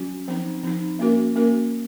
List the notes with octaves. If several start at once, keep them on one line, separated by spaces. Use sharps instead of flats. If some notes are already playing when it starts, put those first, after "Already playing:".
Already playing: F#3 C#4 F#4
F3 C4 D#4
F3 C4 D#4
A#3 C#4 F#4 A#4
A#3 C#4 F#4 A#4